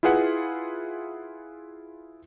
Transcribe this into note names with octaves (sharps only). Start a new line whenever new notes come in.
E4 F4 G#4 B4 F#5